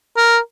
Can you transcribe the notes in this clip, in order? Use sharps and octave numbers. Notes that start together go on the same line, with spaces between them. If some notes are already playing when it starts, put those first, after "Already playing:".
A#4